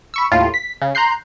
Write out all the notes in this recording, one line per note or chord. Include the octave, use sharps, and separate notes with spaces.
B5 C#6 E6
D#2 A2 F4
B6
C#3
A#5 C6 F#6 G6 C7